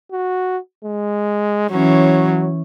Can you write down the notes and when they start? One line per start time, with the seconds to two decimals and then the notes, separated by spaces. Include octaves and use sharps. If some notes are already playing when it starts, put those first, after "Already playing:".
0.12 F#4
0.84 G#3
1.70 E3 F#3 C#4